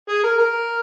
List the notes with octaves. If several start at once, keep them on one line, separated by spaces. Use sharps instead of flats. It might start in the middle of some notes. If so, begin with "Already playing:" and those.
G#4
A#4
A#4